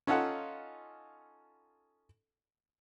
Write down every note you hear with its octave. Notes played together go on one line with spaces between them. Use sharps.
C#4 D#4 F4 A4 F#5